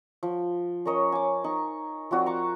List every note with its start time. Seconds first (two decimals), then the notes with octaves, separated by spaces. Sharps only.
0.23 F3
0.85 C#4 A#4 C#5 D#5
1.12 G#5 D6
1.44 D#4 C#6
2.11 F3 C4 F#4 D5
2.26 A#5 C#6 D6